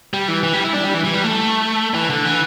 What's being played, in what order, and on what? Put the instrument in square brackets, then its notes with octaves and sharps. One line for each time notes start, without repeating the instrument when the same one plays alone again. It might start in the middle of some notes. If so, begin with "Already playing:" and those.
[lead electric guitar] G3
E3
E3
G3
E4
D4
G3
E3
E3
G3
A3
E3
D3
E3